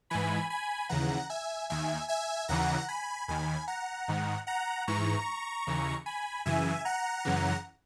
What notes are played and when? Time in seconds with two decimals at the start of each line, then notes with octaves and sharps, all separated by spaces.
0.10 G#2 E3 G#5 B5
0.50 G#5 B5
0.89 D#2 C#3 E3 F#5 A#5
1.30 E5 G#5
1.70 D#2 D#3 E5 G#5
2.08 E5 G#5
2.48 D#2 C#3 E3 F#5 A#5
2.88 G#5 B5
3.28 D#2 D#3 G#5 B5
3.68 F#5 A#5
4.08 G#2 D#3
4.47 F#5 A#5
4.87 G#2 E3 A#5 C#6
5.67 D#2 C#3 E3
6.06 G#5 B5
6.46 F#2 C#3 E3 E5 G#5
6.85 F#5 A#5
7.25 F#2 C#3 E3